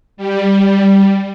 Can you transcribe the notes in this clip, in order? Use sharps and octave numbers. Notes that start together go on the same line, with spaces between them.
G3